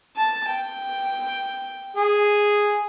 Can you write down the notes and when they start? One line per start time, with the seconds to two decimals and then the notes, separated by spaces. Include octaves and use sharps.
0.17 A5
0.49 G5
1.97 G#4